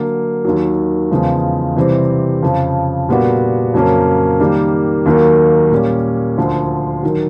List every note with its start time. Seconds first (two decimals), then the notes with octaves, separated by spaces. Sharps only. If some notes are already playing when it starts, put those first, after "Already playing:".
Already playing: D3 F#3 A#3
0.44 D#2 D#3 F#3
1.11 E2 C#3 F3 G#3
1.76 C3 E3 G3 C4
2.42 F2 C#3 F3
3.09 A#2 G3 B3 D4 F#4
3.74 F2 C#3 F#3 A#3 C#4
4.40 D#3 G3 A#3
5.06 D#2 D#3 F#3 A#3
5.71 A#2 G3 A#3 C#4
6.37 D2 D3 F3
7.03 D#3 F#3